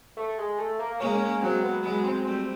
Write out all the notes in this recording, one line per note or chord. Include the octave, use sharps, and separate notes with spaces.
A3
G#3
A3
A#3
G#3 A#3 C#4
C#4
F#3 G#3 C4
B3
F#3 G#3 B3
C4
G3 A3 C4